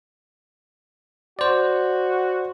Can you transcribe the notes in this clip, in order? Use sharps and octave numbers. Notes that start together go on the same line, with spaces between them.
F#4 C5 D5